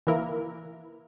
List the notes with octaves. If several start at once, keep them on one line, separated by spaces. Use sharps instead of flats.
E3 A#3 E4 A#4